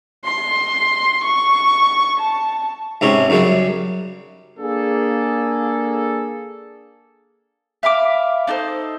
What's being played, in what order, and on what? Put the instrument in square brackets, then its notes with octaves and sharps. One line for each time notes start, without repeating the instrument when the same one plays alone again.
[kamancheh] C6
C#6
A5
[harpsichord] G#2 C3 C#4
F#2 C#3 G3
[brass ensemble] A#3 D4 G#4 A4
[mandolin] E5 F5 B5 D6
D4 D#4 A4 C5